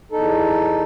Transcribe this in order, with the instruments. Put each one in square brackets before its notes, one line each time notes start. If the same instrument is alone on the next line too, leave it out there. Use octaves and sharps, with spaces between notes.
[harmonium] E2 D#4 A4